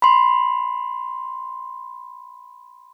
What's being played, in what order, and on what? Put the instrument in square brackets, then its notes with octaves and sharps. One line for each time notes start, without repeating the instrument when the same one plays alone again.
[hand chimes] B5 C6